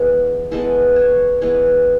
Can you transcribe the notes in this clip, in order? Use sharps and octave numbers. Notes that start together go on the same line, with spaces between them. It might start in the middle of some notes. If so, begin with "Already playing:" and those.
Already playing: E3 G#3 B3
E3 G#3 B3 A4
C#5
E3 G#3 B3 C#5